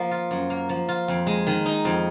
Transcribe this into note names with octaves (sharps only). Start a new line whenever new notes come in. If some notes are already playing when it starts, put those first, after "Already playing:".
Already playing: F3 A#3
F4
F#2
A#3
F3
F4
F2
G#3
D#3
D#4
F2